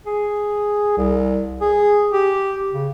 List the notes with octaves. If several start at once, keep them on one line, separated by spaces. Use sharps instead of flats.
G#4
C2
G#4
G4
C#3